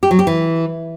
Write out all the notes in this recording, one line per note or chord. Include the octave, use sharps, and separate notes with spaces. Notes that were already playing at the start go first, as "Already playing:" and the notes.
G4
F#3
G4
E3